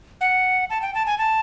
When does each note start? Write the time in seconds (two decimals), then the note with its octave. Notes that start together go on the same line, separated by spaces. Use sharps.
0.21 F#5
0.70 A5
0.82 G5
0.94 A5
1.06 G#5
1.18 A5